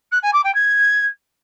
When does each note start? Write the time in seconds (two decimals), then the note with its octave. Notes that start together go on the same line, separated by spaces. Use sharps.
0.12 F#6
0.22 G#5
0.33 D6
0.44 G5
0.54 G#6